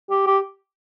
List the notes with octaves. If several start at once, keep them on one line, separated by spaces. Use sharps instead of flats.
G4
G4